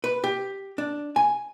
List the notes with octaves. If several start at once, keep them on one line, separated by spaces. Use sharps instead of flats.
B4
G4
D4
G#5